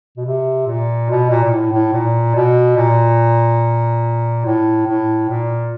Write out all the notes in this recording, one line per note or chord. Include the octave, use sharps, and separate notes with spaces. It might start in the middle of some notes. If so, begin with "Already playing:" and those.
B2
C3
A#2
B2
A#2
A#2
A2
A2
A#2
B2
A#2
A2
A2
A#2